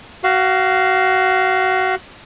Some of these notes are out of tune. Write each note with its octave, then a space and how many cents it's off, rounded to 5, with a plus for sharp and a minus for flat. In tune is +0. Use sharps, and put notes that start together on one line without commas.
F#4 +20 F5 -5